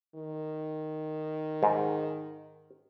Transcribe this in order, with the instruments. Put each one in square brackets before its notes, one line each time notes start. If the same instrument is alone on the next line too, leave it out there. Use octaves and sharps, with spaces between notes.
[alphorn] D#3
[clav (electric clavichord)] G#2